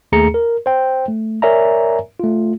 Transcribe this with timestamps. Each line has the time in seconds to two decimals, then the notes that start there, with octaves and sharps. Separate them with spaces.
0.12 D#2 A3 G#4 A#5 C#7
0.34 A#4
0.66 C5 G5
1.08 A3
1.42 A#4 C#5 D5 E5 G#5 A#5
2.20 A3 F4